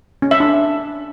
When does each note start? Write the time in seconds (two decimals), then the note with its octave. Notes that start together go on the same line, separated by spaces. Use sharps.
0.22 C#4
0.31 E5
0.40 D4